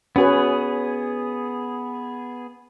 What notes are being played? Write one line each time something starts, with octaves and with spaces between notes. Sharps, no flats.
B3 C#4 F#4 G#4 B4